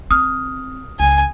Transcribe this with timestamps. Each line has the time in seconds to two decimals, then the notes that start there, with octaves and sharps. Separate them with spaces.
0.11 C4 D#6 F6
1.00 C#2 G#5